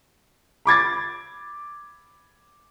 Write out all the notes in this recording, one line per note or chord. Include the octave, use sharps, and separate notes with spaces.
B5 D6 G#6 A6